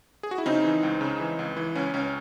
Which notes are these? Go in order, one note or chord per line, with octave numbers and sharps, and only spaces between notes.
G#4
F#4
E4
C#3 C4 D#4
E3
C#2
C#3
E3
C#2
E3
C#2 C#4
C#2 C#4